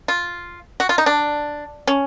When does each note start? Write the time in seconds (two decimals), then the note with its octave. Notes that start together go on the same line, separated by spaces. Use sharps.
0.08 F4
0.80 F#4
0.89 F4
0.98 D#4
1.06 D4
1.87 C#4